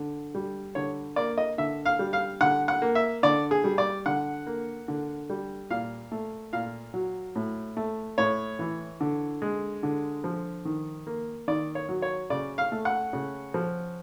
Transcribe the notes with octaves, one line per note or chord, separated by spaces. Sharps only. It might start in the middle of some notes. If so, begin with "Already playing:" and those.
Already playing: D3
G3
D3 C#5
A#3 D5
D#5
D3 E5
F5
G3
F5
D3 F#5
F#5
A#3
E5
D3 D5
G#4
G3
D5
D3 F#5
A#3
D3
G3
A#2 F5
A3
A#2 F5
F#3
A2
A3
A2 C#5
E3
D3
G#3
D3
F3
D#3
A#3
D#3 D5
C#5
F#3
C#5
C#3 D5
F5
A3
F#5
C#3
F3